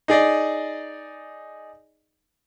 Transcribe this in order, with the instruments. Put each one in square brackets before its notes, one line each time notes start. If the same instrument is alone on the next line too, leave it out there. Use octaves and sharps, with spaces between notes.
[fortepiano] D#4 G#4 D5 D#5